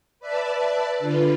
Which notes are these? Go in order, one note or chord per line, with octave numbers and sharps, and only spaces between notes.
B4 D5 E5 A5
D3 F4 B4